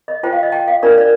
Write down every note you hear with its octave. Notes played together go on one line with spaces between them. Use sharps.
D#5
F4 C5 G5
F5
D#5
G5
F5
D4 F4 A#4 D5
D5